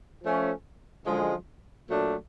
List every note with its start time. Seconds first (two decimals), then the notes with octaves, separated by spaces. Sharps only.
0.23 F3 A3 C#4
1.05 F#2 D3 F3 G#3
1.87 A#2 F#3 A3 D4